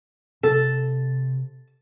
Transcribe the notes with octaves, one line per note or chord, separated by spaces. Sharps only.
C3 A4